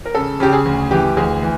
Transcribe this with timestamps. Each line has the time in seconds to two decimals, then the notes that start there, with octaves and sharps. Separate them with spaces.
0.05 A#4
0.15 C#3 A4
0.40 C#3 G4
0.53 G#4
0.65 D2
0.91 E3 G4
1.17 D2 G#4
1.42 E3